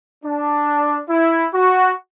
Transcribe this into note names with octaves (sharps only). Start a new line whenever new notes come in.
D4
E4
F#4